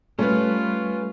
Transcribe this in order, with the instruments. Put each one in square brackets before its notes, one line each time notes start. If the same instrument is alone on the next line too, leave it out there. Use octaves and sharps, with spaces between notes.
[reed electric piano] G3 [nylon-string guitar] A3 [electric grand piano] C#4 B4 [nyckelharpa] F4